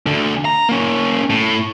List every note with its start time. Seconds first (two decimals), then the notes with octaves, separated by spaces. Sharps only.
0.06 D2 D3
0.45 A#5
0.69 A#3 C#4
1.30 A2